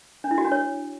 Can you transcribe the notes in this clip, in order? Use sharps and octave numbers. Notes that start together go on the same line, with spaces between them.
D4
E4
F#4
D4
C#5